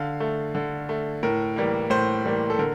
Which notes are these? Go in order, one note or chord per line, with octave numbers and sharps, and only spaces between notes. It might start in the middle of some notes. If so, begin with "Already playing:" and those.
Already playing: D3 F5
A3
D3
A3
A2 A#4
E3 G3 A#3
A2 C5
E3 G3 A#3
A4
D3 A#4